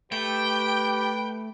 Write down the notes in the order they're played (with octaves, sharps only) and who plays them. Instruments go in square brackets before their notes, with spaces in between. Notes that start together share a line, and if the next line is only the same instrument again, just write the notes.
[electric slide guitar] A3 [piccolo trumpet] G4 [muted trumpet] B4 [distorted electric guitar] G5